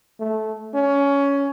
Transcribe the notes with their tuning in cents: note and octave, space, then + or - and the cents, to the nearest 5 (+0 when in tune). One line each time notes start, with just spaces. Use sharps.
A3 -15
C#4 +15